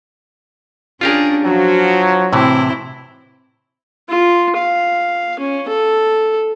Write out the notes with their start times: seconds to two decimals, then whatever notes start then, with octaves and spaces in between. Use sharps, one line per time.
1.01 C#4 D4 F4 G4 G#4 A#4
1.45 F3 F#3 F#4
2.33 A2 C3 E3 C4 E4 C5
4.09 F4
4.57 F5
5.39 C#4
5.68 A4